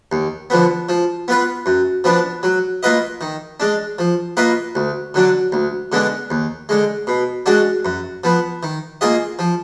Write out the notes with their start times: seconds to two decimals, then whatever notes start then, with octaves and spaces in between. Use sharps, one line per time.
0.12 D#2
0.50 D3 F3 B3
0.89 F3
1.28 B3 F4 B4
1.66 F#2
2.04 F3 B3 D4
2.43 F#3
2.83 A#3 F4 B4 D#5
3.21 D#3
3.60 G#3 D4
3.99 F3
4.37 A#3 F4 B4 D#5
4.75 D2
5.14 D3 F#3 D4
5.52 D2
5.92 D3 G#3 B3 D4
6.31 D#2
6.69 D3 G#3
7.07 B2
7.46 G#3 D4 F#4
7.85 F#2
8.24 F3 B3
8.63 D#3
9.01 A#3 F4 G#4 D#5
9.39 F3